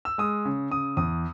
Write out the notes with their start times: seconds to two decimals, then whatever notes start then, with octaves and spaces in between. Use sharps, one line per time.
0.05 E6
0.18 G#3 D#6
0.45 C#3
0.71 C#3 D#6
0.97 E2 D#6